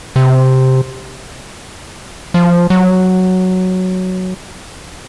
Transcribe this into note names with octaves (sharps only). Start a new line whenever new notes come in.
C3
F3
F#3